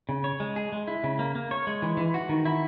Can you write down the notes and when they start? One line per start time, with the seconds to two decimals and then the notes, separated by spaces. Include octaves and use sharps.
0.09 C#3
0.24 C#5
0.40 G#3
0.56 G#4
0.72 G#3
0.87 E4
1.04 C#3
1.19 A#3
1.35 A#3
1.51 C#5
1.67 G#3
1.82 E3
1.97 E3
2.14 F#4
2.29 D#3
2.45 E4